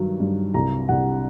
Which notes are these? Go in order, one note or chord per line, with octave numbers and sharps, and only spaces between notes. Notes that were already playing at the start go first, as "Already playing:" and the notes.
Already playing: G2 D#3 F#3
G2
C2 A#5
C2 F#5